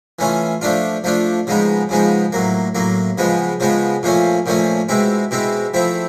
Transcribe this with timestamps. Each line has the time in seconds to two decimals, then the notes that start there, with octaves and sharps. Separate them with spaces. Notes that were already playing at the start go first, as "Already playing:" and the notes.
0.19 E3 A3 C#4 F4
0.62 F3 A3 D4 F4
1.04 F3 A3 D4 F4
1.47 C#3 F3 G#3 B3 D#4
1.89 C#3 F3 G#3 B3 D#4
2.32 A2 F#3 A#3
2.75 A2 F#3 A#3
3.18 C#3 F3 G#3 B3
3.60 C#3 F3 G#3 B3
4.03 A#2 F3 A3 C#4
4.46 A#2 F3 A3 C#4
4.89 B2 G#3 C4 E4
5.31 B2 G#3 C4 E4
5.74 F3 A3 C4 E4